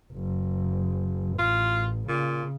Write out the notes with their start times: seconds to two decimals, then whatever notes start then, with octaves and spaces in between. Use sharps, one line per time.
0.13 F#1
1.39 A1 F4
2.08 A#2 C#3